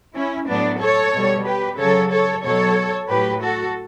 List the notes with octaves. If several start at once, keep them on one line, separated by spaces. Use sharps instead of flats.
C#4 E4
A2 F#3 B3 D4
A4 C#5
B2 G3
G4 B4
C#3 F#3 A4 C#5
A4 C#5
B2 F#3 A4 C#5
A2 F#3 G4 B4
F#4 A4